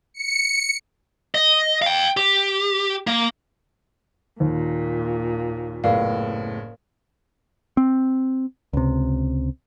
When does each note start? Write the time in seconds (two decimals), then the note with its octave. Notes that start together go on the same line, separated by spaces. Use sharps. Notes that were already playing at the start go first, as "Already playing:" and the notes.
0.14 C#7
1.35 D#5
1.82 F5 G5
2.17 G4
3.07 A#3
4.40 D#2 A#2
5.84 F#1 A2 B3 A#4 D5 F5
7.77 C4
8.73 C#2 C3